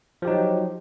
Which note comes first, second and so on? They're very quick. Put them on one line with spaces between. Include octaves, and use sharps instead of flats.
F3 G4 D#4 F#3